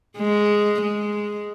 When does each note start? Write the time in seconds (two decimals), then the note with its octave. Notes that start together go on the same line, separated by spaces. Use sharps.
0.18 G#3
0.81 G#3